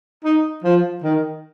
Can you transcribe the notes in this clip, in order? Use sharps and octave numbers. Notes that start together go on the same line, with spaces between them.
D#4
F3
D#3